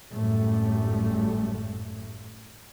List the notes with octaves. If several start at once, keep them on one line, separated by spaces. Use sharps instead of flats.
G#1 F#2 A2 G3 A3